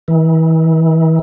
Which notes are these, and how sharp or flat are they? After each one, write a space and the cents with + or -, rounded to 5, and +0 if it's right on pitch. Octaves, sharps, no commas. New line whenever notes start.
E3 -35